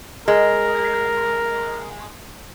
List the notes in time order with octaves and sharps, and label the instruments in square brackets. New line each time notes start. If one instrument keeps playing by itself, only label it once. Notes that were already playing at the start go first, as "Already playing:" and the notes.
[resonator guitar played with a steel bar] G#3 [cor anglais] A#4